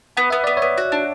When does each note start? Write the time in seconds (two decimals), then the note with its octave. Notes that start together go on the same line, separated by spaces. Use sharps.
0.17 B3 F#5
0.30 B3 E5
0.44 B3 D5
0.57 B3 C#5 E5
0.78 F#4
0.92 D4